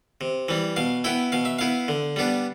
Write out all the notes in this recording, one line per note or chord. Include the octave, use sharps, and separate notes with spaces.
C3
E3 G3
B2 F5
B3 E4 G5
B2 F5
E5
B3 E4 F5
D3
G3 B3 D4